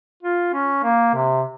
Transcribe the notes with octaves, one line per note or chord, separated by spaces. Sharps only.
F4
C#4
A#3
C3